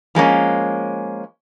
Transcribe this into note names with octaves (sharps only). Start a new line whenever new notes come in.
F3 G#3 A#3 C#4